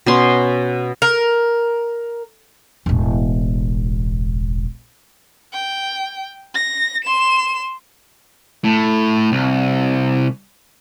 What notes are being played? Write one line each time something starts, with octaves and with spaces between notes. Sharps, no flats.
B2 C#4 C6
A#4
E1 A1
G5
A#6
C6 E7
A2
C2